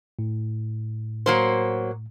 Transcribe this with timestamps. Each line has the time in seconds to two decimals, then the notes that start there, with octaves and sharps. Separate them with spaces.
0.19 A2
1.26 F#3 A#3 C5